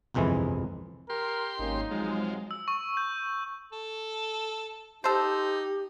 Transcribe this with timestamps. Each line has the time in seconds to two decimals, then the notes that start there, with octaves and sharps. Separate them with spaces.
0.14 G1 C2 F2 E3 G#3 E4
1.10 G4 A#4 C6
1.59 G#1 A#3 C#4 D#4
1.91 G#2 C3 F3 F#3 G#3
2.51 E6
2.68 C#6
2.97 G6
3.72 A4
5.04 D#4 G4 A4 C5